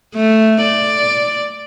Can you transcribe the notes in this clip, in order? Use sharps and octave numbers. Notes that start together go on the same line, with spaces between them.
A3
D5